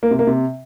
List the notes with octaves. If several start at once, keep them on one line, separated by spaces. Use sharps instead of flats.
A#3
C3
A#3
C3